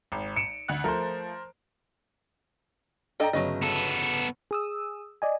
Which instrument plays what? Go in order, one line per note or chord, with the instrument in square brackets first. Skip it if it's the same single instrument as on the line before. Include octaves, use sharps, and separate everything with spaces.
[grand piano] G#1
C#7 D7 E7
[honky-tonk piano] D2 F#5 F#6
[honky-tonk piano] F3 A3 [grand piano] A#4 C5
[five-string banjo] D4 A4 D#5 [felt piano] D5 G5 A#5
[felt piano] G1 C#3 A#6 [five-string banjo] F#3 C#4 D#5
[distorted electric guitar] B3 A4
[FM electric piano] G#4 D#6 E6
D5 D#5 G#5